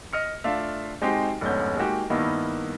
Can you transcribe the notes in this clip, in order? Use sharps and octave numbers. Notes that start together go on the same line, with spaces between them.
D#5 F6 C#7
A3 D4 F4 E5 F5
G#3 C4 D#4 F#4 G4
F1 G#2 D3 B3 C#4 G6
G#3 A#3 D#4 F#4 G4
G2 D#3 A#3 B3 D#4 E4